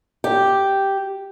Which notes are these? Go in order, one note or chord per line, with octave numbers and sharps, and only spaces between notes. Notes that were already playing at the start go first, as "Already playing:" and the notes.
G4